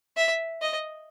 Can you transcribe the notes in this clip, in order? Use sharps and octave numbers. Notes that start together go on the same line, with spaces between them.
E5
D#5